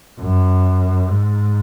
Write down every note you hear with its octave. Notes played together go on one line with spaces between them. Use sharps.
F#2
G#2